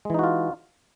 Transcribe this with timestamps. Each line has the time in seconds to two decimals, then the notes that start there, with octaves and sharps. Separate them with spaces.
0.05 G#3
0.10 E3
0.14 D#4
0.19 F#4
0.24 F4